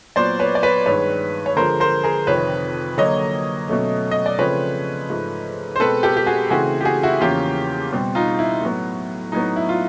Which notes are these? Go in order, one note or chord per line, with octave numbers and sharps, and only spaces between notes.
A#2 F#3 B3 C5 D5
B4 C#5
D5
B4 C#5
G2 D#3 G#3 B4 C#5
C#5
D3 F3 G#3 A#4 C5
A#4 C5
G#4 A#4
F2 C3 D#3 B4 C#5
D3 F#3 A#3 C#5 D#5
B2 F#3 A3 C#4
D#5
D5
C#3 F3 A3 C4 B4 C#5
G#2 F3 A3
C5
B2 G#3 C4 A4 B4
G4 A4
G4
F#4 G#4
C#3 E3 A3 C4 F#4 G#4
G4
F#4 G#4
E4 F#4
E2 C#3 F3 A#3 C#4 F4 G4
B2 G3 C4
D#4 F4
E4
A2 F#3 B3
A2 F#3 B3 D#4
E4
F4